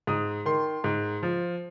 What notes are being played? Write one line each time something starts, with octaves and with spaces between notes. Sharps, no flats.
G#2 D#6
D#3 C6
G#2
F3